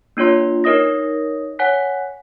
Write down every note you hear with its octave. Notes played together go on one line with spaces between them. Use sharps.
A#3 D4 F4 C#5 C6
D#4 A#4 C#5 D#5 D#6 A#6
C#5 F#5 G#5 F#6 B6